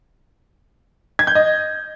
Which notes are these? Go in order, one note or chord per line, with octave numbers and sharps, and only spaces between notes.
G#6
G6
D#5